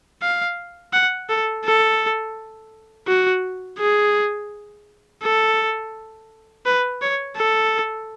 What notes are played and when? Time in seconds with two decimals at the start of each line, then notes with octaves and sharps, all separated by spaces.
0.22 F5
0.93 F#5
1.29 A4
1.65 A4
3.08 F#4
3.79 G#4
5.23 A4
6.66 B4
7.02 C#5
7.37 A4